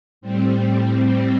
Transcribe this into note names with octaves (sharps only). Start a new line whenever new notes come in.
A2 G3 C4
A2 G3 C4